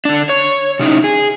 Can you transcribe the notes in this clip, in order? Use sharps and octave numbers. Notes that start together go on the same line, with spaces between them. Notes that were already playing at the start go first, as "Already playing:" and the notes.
D3 D4
C#5
C3 C#4 D#4 E4
G#4